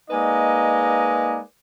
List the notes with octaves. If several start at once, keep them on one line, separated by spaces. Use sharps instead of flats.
G#3 A#3 D#4 B4 D5 D#5